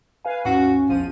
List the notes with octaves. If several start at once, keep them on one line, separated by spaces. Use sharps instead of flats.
B4 F5 G#5
D#2 G#2 C#4 F#4
A#1 E2 F3 D#7